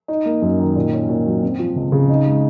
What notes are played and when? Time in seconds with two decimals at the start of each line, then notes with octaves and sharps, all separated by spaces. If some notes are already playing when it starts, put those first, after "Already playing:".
0.08 D#4
0.26 A#3
0.42 F#2
0.59 D#3
0.76 A#2
0.93 C#4
1.09 A#2
1.26 F#3
1.43 C4
1.59 F3
1.76 C#2
1.92 C#3
2.09 D#4
2.26 G#3